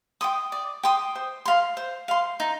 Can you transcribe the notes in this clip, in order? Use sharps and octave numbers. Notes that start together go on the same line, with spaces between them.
G5 C6 D#6
D5
G5 C6 D#6
C5
F5 C6
C5
F5 C6
D#4